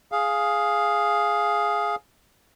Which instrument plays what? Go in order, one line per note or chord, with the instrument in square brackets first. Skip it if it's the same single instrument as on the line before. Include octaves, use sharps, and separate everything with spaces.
[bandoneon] G#4 F5